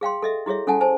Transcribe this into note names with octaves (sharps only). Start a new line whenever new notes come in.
G#4 F5 G5 C6
A4 D#5 E5
E4 F#4 G#4 C#5 E5
C#4 A4 F#5 G#5 A5
C5 G#5 A5